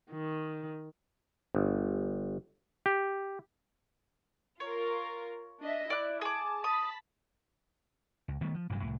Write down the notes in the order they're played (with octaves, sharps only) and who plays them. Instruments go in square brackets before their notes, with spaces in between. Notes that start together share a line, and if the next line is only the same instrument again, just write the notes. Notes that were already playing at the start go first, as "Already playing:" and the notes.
[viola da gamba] D#3
[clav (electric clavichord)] G1
G4
[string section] F4 A#4 [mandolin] C#5
[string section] D4 D#5 E5
[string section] E4 [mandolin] D5 F#6
[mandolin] G#4 D6 [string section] A5
[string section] A5 B5 A6 [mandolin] D#6
[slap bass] C#2
D#3 G3 A3 B3
F3
A1 G2 C3 F#3
C2 A2